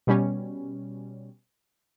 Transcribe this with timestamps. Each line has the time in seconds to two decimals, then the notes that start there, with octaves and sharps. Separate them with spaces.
0.07 B2 G3 C#4